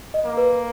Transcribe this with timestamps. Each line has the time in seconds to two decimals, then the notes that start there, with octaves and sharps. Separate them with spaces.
0.14 D#5
0.26 A#3
0.37 B4